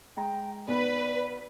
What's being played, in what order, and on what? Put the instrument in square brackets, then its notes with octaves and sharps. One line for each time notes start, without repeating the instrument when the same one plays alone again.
[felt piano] G#3 A#5 [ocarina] G5
[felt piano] B1 B3 B5 [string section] B4 [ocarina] D5